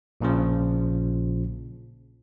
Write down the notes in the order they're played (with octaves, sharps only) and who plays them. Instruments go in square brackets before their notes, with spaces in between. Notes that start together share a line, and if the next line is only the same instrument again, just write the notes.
[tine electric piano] A#1 A#2 C#3 F3